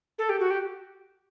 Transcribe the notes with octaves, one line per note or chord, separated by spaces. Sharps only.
A4
G4
F#4
G4